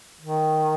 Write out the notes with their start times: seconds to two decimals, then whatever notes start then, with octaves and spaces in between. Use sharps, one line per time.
0.21 D#3